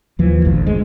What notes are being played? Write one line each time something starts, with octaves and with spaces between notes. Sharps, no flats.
D#2 E3 F3
E1 A1 D2
G#3